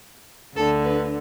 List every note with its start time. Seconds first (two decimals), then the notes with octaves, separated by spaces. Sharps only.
0.56 D2 D3 A4
0.85 B4